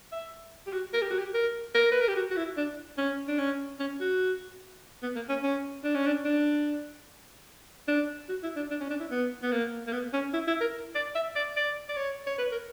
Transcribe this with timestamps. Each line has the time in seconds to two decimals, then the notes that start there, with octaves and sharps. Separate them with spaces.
0.12 E5
0.67 G4
0.73 F#4
0.93 A#4
1.02 G4
1.10 F#4
1.19 G4
1.34 A#4
1.75 A#4
1.92 B4
2.01 A#4
2.08 G4
2.16 F#4
2.30 F#4
2.37 E4
2.57 D4
2.98 C#4
3.28 D4
3.39 C#4
3.80 C#4
4.01 F#4
5.03 B3
5.16 A#3
5.29 C#4
5.43 C#4
5.84 D4
5.95 C#4
6.07 D4
6.25 D4
7.88 D4
8.29 F#4
8.43 E4
8.56 D4
8.71 D4
8.80 C#4
8.90 D4
9.00 E4
9.11 B3
9.43 B3
9.52 A#3
9.87 A#3
9.92 B3
10.13 C#4
10.34 E4
10.47 E4
10.61 A#4
10.95 D5
11.15 E5
11.36 D5
11.57 D5
11.89 D5
11.97 C#5
12.27 C#5
12.38 B4
12.52 A#4